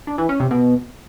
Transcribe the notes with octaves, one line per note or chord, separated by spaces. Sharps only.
D4
E3
C#4
C3
B2